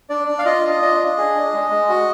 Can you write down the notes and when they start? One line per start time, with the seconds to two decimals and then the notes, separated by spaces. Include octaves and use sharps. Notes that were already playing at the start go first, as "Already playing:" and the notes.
0.10 D4 D5
0.28 D4
0.39 F5
0.45 F4 D#5
0.64 F4
0.81 D4 D#5
1.00 D4
1.18 G#4
1.36 D4
1.54 G#3
1.71 G#3
1.89 F#4